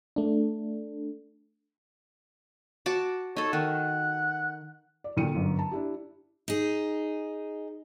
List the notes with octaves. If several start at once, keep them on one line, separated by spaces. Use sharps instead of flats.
A3 D4
F#4 A5 D6
D#4 A4 C#5
D#3 F#5
D5
E2 A#2 D3 G5 C#7 D#7
G1 F#2
A5
D4 E4 G4
D#4 G#4